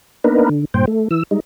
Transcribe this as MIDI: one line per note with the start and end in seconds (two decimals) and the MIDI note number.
0.24 0.49 58
0.24 0.49 59
0.24 0.49 62
0.24 0.49 63
0.24 0.49 70
0.24 0.49 71
0.49 0.65 50
0.74 0.85 43
0.74 0.85 46
0.74 0.85 72
0.74 0.85 79
0.87 1.08 57
1.11 1.23 52
1.11 1.23 88
1.31 1.40 55
1.31 1.40 56
1.31 1.40 63